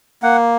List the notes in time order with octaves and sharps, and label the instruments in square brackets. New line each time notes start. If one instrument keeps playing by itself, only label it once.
[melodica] A#3 F#5